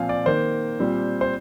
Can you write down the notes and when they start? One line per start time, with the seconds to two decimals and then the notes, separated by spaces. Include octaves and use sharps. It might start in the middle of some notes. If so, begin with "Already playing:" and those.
Already playing: A#2 F3 C4 F5 G#5
0.09 D5
0.26 D#3 A#3 C5
0.80 A#2 G3 C4
1.21 C5